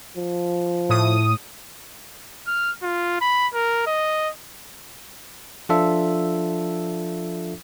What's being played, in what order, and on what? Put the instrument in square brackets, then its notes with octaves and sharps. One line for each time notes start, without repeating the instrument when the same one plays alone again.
[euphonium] F3
[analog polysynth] A2 D#6
[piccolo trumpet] F6
F4
B5
A#4
D#5
[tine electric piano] F3 D4 F4 A4 E5